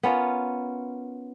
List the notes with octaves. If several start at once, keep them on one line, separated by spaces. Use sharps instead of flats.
B3 C#4 F4 A#4